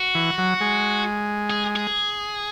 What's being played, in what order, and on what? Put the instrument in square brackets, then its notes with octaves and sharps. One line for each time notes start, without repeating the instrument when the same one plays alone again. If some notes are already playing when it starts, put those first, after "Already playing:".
Already playing: [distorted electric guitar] F#4
[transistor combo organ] E3
F#3
G#3
[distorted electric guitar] G#4
G#4